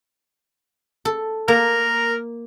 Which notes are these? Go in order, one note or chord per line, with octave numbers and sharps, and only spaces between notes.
A4
A#3 A#4